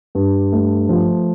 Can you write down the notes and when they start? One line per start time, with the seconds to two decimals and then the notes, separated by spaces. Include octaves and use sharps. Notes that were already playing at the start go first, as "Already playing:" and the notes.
0.15 G2
0.52 A3
0.89 F3